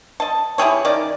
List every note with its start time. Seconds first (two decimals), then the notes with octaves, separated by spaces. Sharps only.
0.20 D#5 A5
0.58 E4 G4 G#4 C#5
0.85 D#3 C#4 D5